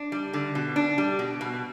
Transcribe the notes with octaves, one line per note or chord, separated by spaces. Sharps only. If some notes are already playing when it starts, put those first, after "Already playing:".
Already playing: D4
G3
D3
B2
D4
G3
B2
B2